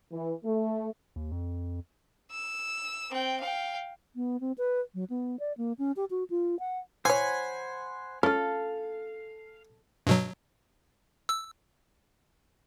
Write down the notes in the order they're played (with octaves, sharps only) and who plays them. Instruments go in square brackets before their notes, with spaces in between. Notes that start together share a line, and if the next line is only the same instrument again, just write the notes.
[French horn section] E3
A3
[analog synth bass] D#2
F2
[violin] E6
C4 G5
F5 G5
[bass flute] B3
C4
B4
F#3
B3
D5
A#3
C#4
G4
F#4
F4
F#5
[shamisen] E3 C#5 [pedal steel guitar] C5 F#5 B5 [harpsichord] G#5
[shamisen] C#4 F4 [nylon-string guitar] A4 [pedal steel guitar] F5
[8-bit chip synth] G2 B2 F#3
E6